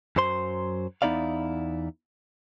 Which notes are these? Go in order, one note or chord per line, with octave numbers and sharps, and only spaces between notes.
F#2 F#3 C5 C6
E2 B3 D#4 E4 D5 F5